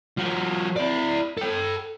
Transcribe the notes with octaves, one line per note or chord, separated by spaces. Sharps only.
F3 F#4
E4 D5
A4 G5